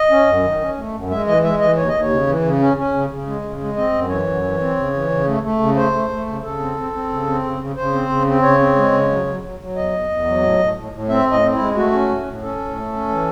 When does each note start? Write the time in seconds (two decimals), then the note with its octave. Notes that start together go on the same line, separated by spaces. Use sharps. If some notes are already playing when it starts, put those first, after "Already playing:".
Already playing: D#5
0.10 C#4
0.27 F#2
0.43 D#3
0.61 C#4
0.77 A3
0.93 F#2
1.10 G#3 E5
1.27 E3 D#5
1.43 G#3 E5
1.60 E3 D#5
1.77 D#2 C#5
1.89 D#2 D#5
2.01 C#5
2.10 C#3
2.27 E3
2.43 C#3
2.60 C#4
2.77 C#4
2.93 C#3
3.10 C#3
3.26 G#3
3.43 C#3
3.60 G#3
3.77 C4 D#5
3.93 F#2
4.09 E3 C#5
4.27 F#2
4.43 E3
4.59 C4
4.76 C#3
4.93 E3
5.10 C#3
5.26 A3
5.43 A3
5.60 C#3
5.76 A3 C5
5.93 A3
6.10 A3
6.26 C#3
6.43 C#3 A4
6.59 C4
6.76 C4
6.93 C4
7.09 C#3
7.26 C4
7.43 C#3
7.60 C#3
7.76 C#3 C5
7.93 C4
8.09 C#3
8.26 C4
8.42 C#3 C#5
8.59 C4
8.76 G#3
8.92 C#3
9.09 F#3
9.26 F#3
9.43 F#3
9.59 F#3
9.76 E2 D#5
9.93 E2
10.09 E2
10.26 F#3
10.42 A2
10.59 A2
10.76 A2
10.92 A2
11.09 C4 E5
11.26 A2
11.32 D#5
11.42 C4
11.54 E4
11.59 G#3
11.76 A3 F#4
11.92 C#4
12.09 A2
12.26 A2
12.42 C#4 A4
12.59 A2
12.76 A3
12.92 C#4
13.08 E3